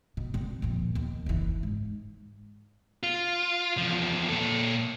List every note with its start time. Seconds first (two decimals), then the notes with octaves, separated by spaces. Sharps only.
0.17 B2
0.34 D3 C4
0.62 F2 A#2
0.95 D#2 B2
1.26 F#1 E3
1.63 G#2
3.03 F4
3.78 E2 F3
4.29 A#2 A4